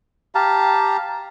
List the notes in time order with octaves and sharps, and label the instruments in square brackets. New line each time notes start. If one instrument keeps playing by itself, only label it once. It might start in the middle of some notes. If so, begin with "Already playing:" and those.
[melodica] G4 F5 A5 A#5